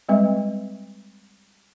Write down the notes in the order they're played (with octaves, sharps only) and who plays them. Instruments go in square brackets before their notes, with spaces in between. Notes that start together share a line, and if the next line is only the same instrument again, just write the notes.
[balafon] G3 G#3 C4 B4 E5